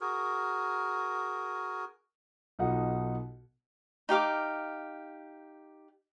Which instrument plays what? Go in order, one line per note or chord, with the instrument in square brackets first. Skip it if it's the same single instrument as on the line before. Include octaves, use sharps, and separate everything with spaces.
[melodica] F#4 G#4 A#4
[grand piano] B1 B2 D#4 F4 A4 F#5
[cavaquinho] D#4 G4 F5 D6